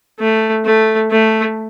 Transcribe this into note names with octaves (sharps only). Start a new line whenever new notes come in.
A3
A3
A3